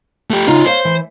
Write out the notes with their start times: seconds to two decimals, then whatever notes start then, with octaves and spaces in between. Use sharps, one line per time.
0.30 A3 G4
0.48 C#3 D#4 F4 F#4
0.66 C5 C#5 F5
0.85 E3